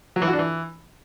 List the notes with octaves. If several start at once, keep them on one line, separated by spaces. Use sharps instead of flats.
F#3
E3
F#4
D4
E3